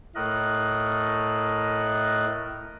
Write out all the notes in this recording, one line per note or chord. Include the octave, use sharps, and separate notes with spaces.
A2 A3 A#4 D#5 F#6